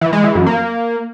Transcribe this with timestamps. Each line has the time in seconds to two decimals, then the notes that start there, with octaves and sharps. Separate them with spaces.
0.01 E3
0.13 G#3
0.24 E3
0.35 F#2
0.46 A#3